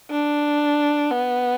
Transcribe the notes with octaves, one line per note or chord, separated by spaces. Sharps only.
D4
B3